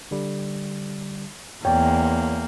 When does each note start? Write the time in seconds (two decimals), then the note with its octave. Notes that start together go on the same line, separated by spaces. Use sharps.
0.11 D3 G3
1.65 E2 A#3 C#5 D5 G5